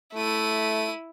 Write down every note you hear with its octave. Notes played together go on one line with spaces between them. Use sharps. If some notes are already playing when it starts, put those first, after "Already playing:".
A3 E4 D#7